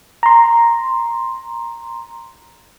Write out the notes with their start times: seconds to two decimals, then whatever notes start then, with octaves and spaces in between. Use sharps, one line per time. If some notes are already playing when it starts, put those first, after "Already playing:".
0.23 A#5 C6